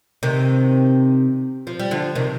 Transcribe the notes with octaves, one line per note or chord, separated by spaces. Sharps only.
C3 D#3
F3
G3
D3 F3
C3 D#3